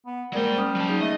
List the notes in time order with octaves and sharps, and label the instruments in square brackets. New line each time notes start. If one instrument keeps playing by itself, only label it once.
[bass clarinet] B3
[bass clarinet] G3 [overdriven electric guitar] G#3 C5 [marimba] A#3 A#4 D5
[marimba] C#4 D#6 F6
[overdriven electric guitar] F#3 A5
[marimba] D#4 G#4 D#6
[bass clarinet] A3 [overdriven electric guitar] D#5